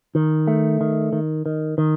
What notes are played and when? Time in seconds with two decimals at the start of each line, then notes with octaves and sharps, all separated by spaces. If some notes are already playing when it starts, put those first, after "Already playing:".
0.15 D#3
0.47 A3
0.81 D#3
1.13 D#3
1.46 D#3
1.78 D#3